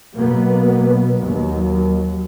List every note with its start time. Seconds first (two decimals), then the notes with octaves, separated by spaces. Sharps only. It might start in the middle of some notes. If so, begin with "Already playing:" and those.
0.14 B2 F#3 A#3 B3
1.16 D#2 F#3